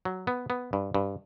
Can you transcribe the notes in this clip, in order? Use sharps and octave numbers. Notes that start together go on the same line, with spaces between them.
F#3
B3
B3
G2
G2